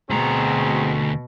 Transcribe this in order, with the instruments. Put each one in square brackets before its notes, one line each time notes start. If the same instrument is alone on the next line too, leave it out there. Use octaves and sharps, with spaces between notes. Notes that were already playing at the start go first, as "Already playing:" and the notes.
[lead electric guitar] D2 A#5 [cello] B2 [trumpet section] C4 F#4 G#4